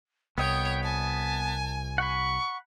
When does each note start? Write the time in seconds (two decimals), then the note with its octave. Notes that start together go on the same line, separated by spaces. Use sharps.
0.38 C2 B3 C#5 D#5 G5
0.84 G#5 A5
1.98 F#5 B5 C#6